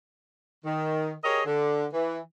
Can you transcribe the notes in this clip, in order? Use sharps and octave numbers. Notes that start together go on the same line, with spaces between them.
D#3
G4 G#4 A#4 C#5 D#5
D3
E3